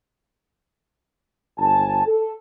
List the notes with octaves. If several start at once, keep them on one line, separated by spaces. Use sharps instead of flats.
G1 G#5 A5
A4